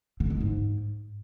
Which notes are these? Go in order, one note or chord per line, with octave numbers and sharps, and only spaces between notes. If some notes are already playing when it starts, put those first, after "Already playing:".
D3
G#3
G#2